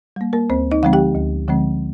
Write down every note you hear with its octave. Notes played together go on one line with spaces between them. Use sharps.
G3 A#3
A#3 A#4
D2 C4 C5
D#4 D#5
D3 F3 G#3 C4 F5
G4 G5
D2
D3 F3 G#3 C4